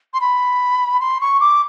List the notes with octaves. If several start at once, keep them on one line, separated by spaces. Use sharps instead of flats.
C6
B5
C6
C#6
D6